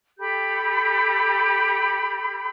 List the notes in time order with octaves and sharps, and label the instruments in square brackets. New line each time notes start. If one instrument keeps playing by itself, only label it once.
[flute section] G4 A4 B5 G6